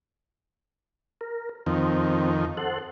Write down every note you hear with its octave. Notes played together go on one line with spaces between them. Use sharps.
A#4
F2 D#3 C4
A4 C5 F#5